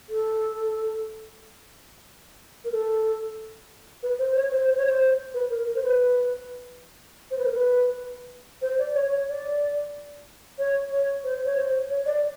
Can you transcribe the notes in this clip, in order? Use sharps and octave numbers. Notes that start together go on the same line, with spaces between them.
A4
A#4
A4
B4
C5
C#5
C5
C5
C#5
C5
B4
A#4
A#4
C5
B4
C5
B4
A#4
B4
C5
D5
C#5
C#5
D5
C#5
C#5
C5
C#5
C5
C#5
D5